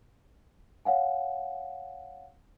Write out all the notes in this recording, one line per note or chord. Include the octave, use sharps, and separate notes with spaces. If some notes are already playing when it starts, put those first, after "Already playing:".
C#5 F5 F#5 G#5